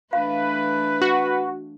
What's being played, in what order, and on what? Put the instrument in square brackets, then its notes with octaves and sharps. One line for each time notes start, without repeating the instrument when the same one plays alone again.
[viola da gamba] E3 A3 D4 [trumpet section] B4 [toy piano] F5
[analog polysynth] F#4